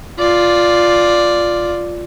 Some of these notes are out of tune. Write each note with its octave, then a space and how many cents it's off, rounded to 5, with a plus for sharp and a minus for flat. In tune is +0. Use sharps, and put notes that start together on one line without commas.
F4 +0 D5 +0